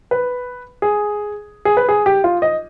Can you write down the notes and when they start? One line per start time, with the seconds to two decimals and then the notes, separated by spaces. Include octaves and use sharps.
0.11 B4
0.82 G#4
1.65 G#4
1.77 B4
1.89 G#4
2.06 G4
2.24 F4
2.42 D#5